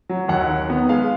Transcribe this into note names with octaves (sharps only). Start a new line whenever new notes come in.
F#3
D#2 F#5
D#3
B3
G#3 F5